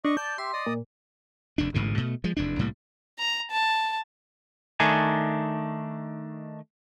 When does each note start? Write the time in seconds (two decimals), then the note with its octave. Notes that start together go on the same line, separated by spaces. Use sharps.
0.05 D4 D#5 C#6
0.17 D5 A5 G6
0.38 G4 E5 C6
0.53 D5 D#5 D#6
0.66 A#2
1.58 F1 D#2 D4
1.74 A1 G#2 B2 D3
1.98 B2 A3
2.24 F3 G#3
2.37 F1 E2 D4
2.59 C2 A2 G3 A#3
3.19 A#5
3.51 A5
4.80 D#3 A3 D4 D#4 G#5